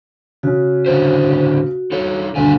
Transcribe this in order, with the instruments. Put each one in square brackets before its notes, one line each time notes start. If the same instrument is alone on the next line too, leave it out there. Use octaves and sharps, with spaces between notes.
[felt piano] C#3 C#4 [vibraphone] F#4
[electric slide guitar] A2 D3 C5
D#4 A4 C#5
[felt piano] D2 G2 D3 [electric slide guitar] A#2 D#3 G#5